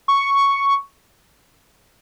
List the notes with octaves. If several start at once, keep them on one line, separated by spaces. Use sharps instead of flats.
C#6